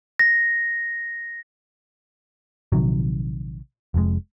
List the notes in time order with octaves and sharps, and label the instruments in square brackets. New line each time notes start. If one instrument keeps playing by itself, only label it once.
[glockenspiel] A#6
[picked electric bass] A#1 C3 D#3 F#3
F1 F2 G#2 G#3